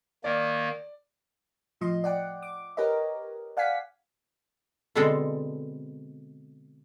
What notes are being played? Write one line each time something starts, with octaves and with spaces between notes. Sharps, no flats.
D#3 A#3 D5
A2 F3 D#5 C6
D5 F#5 G5
D6
G4 A#4 B4 C#5 D#5
D5 F5 F#5 G#5 B6
B2 D3 G#3 C4 A4